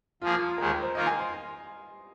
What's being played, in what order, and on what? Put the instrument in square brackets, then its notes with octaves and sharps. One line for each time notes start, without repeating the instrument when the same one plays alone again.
[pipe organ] F3 A#3 G#4 [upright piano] F4
[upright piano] F4
[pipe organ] D#2 D#3 G#3 [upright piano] A#4
[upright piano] A#4
C5
[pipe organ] D#3 A#3 F4 A#4 [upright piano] D#5
[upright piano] G#5
C6